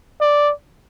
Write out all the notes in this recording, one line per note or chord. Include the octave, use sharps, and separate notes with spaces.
D5